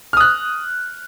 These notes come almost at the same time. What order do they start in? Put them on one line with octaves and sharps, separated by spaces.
F6 D#6 F#6